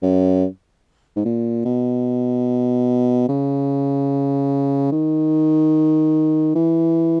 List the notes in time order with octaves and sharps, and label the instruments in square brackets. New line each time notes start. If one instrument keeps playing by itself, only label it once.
[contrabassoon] F#2
G#2
A#2
B2
C#3
D#3
E3